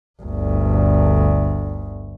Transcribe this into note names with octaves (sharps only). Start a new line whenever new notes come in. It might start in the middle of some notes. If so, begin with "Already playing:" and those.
G1 D2